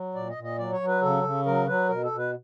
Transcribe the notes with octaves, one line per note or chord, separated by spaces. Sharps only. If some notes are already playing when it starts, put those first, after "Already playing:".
Already playing: F#3
A#2 D5
D#5
A#2
D#5
F#3 D5
C#5
F#3
B4
C#3 A4
C#3
F#3 A#4
F#3 B4
B2 A#4
A4
B2
B4